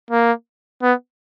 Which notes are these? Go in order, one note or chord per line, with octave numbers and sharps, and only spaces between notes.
A#3
B3